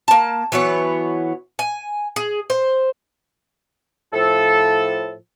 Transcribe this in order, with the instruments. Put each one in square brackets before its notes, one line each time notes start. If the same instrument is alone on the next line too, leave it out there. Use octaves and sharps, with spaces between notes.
[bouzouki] A#3 A5
E3 F#3 B3 C#5
G#5
G#4
C5
[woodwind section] A2 F3 A4